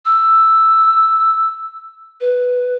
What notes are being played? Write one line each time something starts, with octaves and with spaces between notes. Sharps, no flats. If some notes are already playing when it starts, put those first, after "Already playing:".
E6
B4